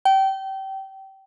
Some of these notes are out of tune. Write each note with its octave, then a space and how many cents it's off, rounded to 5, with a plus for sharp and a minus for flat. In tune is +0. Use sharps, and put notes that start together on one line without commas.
G5 -25